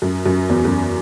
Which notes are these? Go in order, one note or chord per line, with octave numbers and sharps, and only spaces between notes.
F#2
F#2
E2
F#2